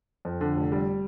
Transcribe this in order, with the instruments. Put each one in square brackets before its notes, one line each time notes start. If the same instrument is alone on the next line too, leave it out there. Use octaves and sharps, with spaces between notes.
[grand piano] F2
D3
F1
G3